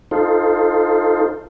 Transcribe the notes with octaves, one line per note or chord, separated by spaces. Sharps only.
D#4 F4 A4 C5